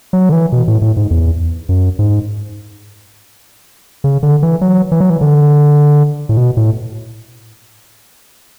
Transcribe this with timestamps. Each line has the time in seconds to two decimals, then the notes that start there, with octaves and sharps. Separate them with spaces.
0.13 F#3
0.29 D3
0.32 E3
0.52 B2
0.68 A2
0.82 A2
0.97 G#2
1.11 E2
1.69 F#2
1.99 G#2
4.04 C#3
4.23 D3
4.42 E3
4.61 F#3
4.92 E3
5.00 F#3
5.10 E3
5.21 D3
6.29 A2
6.37 B2
6.57 A2